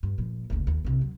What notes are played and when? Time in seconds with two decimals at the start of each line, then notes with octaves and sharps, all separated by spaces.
0.03 G2
0.18 A#2 F3
0.50 F#1 D2
0.67 D#2
0.85 C2 C4
1.01 F#3